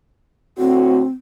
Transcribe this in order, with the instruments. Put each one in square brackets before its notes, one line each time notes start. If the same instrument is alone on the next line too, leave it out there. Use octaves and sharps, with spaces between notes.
[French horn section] D2 A2 F#4 [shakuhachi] C4